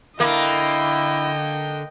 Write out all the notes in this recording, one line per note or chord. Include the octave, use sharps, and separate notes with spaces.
D3 A#3 E4 D#5 G5